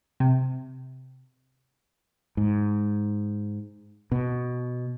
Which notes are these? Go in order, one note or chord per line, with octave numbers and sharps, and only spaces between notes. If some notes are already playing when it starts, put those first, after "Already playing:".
C3
G#2
B2